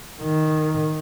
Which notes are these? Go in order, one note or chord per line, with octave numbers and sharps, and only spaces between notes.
D#3